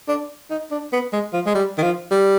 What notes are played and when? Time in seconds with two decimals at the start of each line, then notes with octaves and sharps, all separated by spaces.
0.08 D4
0.50 D#4
0.71 D4
0.93 B3
1.13 G#3
1.33 F3
1.46 G#3
1.55 G3
1.78 D#3
1.82 F3
2.11 G3